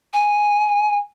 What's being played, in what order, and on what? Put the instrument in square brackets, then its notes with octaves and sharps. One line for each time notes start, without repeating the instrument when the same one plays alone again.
[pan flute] G#5